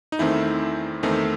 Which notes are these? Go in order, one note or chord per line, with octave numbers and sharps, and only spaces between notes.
D#4
E2 D#3 A3 C4 E4
E2 D#3 A3 C4 D#4